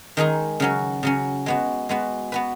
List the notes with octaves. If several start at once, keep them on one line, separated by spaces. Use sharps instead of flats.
D#3 G#3 D#4 G#4
C#3 F#3 C#4
C#3 F#3 C#4
G#3 B3 F#4
G#3 B3 F#4
B3 F#4 B4